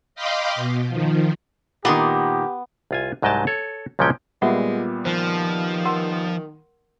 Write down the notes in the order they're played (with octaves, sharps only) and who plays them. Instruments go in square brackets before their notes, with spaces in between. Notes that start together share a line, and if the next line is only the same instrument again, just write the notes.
[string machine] D#5 F5 G5 B5 C6 D6
B2
D#3 F3
[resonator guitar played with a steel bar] A#2 D#3 [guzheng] B3 C6 [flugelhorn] G4
[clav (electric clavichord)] C2 F4 G#5
C2 G#2 F#3 D#5 G5 A5
A4 C#5
C#2 A#2 F3 F#3 C#4 G5
[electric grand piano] A#2 G3 B3 [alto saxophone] G#3 [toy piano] F4 E5 F#5
[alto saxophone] D#3 [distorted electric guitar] F3 [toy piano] C5
[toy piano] A#4 F#5 C6